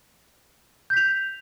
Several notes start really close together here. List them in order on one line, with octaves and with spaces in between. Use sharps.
G6 B6 F7